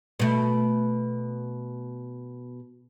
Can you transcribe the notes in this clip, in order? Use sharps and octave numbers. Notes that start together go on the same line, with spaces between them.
B2 A3